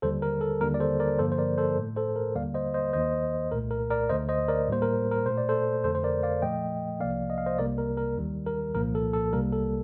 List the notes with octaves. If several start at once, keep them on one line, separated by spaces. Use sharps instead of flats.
D#2 D3 G3 A4 C5
A#4
A4
D#2 D3 G3 A#3 A#4
D5
A4 C5
A#4 D5
G2 D3 F3 A#3 A4 C5
C5
A#4 D5
A4 C5
A2 A3
A4 C5
A#4
D#2 D3 G3 A#3 D5 F5
C5 D#5
C5 D#5
D#2 D#3 A#3 C5 D#5
C2 A#2 A3 A#4
A#4
A#4 D5
D2 D3 A3 C5 D#5
C5 D#5
A#4 D5
A2 G3 A#3 C5
A#4
A#4
A#2 A3 C5
D5
A4 C5
F2 D3 A3 A4 C5
C5
A#4 D5
D5 F5
A#2 F3 A3 D#5 G5
C2 C3 F3 A#3 D5 F5
D#5
F5
C5 D#5
C2 C3 G3 A#3 A#4 D5
A#4
A#4
D#2 D#3 G3
A#4
C2 A#2 F3 A#3 A#4
A4
A4
C2 C3 G3 A#3 A#4
A4